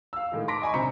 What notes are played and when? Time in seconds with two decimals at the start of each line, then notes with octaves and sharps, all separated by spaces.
0.13 F5 E6
0.32 A2 D#3 G#3
0.48 A5 C6 D6 A#6 B6 D7
0.62 D#5 G#5 B5 C#6
0.74 A#1 C3 C5 A#5 B6 C#7